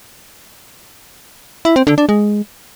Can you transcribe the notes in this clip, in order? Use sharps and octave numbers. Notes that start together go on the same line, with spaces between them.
E4
C4
D3
D4
G#3